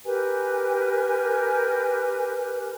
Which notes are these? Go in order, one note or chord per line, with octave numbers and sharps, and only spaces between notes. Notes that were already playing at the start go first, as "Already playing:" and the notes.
G4 A#4 B4 G#5